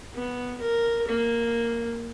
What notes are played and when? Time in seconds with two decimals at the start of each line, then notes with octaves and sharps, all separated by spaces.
0.15 B3
0.61 A#4
1.08 A#3